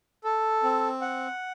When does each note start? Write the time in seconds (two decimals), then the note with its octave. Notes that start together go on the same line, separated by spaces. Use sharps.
0.24 A4
0.63 C4
1.01 F#5